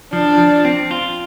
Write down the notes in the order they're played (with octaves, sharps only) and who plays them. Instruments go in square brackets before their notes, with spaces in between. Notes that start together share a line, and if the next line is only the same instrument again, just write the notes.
[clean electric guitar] F3 [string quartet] D4
[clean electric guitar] F3
C4
F4